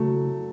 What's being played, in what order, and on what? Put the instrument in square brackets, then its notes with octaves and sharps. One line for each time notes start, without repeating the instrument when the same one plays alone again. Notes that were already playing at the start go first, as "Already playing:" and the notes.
Already playing: [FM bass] C#3 [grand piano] F#3 A3